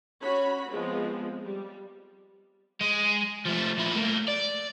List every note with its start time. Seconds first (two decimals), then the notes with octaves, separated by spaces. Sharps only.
0.22 C#4 F#4 C#5 B5
0.68 F3 G#3 B3 C4
1.44 G3
2.81 G#3
3.45 F3 A3
3.77 A#2 E4
3.95 A3 A#3
4.28 D5